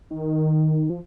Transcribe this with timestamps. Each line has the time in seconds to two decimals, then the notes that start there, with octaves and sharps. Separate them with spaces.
0.10 D#3
0.90 F3